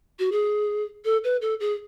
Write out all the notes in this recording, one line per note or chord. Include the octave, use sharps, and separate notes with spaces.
F#4
G#4
A4
B4
A4
G#4